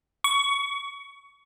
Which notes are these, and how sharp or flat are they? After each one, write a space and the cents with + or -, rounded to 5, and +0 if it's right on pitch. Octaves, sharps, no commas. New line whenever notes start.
C#6 +20